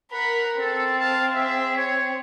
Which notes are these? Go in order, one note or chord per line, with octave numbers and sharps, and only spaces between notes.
A#4 F#5 B5
C4 A4
F5 A5
G#4 E5
C#5